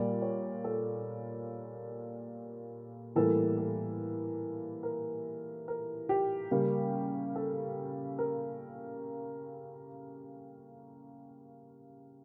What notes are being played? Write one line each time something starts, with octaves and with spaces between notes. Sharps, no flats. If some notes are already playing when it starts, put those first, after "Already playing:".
Already playing: A#2 G3 A#3 D5
C#5
A4
A2 E3 G3 A#3 A4
A4
A#4
A#4
G4
C#3 G3 A#3 G4
A4
A#4